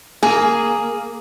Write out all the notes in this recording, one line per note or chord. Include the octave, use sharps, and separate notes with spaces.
A#3 G#4